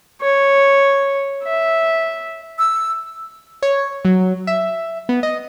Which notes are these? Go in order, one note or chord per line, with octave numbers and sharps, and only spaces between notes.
C#5
E5
E6
C#5
F#3
E5
B3
D#5